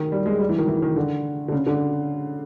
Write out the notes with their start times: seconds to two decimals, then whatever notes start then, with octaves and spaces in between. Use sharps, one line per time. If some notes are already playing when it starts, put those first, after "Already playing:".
Already playing: D#3
0.12 G3
0.26 G#3
0.40 G3
0.49 E3
0.59 D#3
0.68 E3
0.82 D#3
0.96 D3
1.48 D3
1.52 C#3
1.66 D3